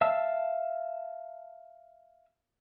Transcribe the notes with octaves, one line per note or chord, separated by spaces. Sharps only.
E5 F5 A5 E6